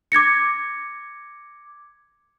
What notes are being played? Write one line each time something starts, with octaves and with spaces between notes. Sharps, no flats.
D6 G#6 A#6 C#7